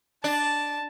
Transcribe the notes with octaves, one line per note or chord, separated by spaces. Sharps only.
D4 A5